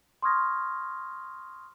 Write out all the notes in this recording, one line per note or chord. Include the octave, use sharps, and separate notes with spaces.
C6 C#6 D#6 F6 G#6 A#6